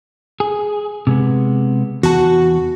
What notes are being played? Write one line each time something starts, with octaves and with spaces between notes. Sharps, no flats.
G#4
C3 G#3 B3
E2 F#4 A5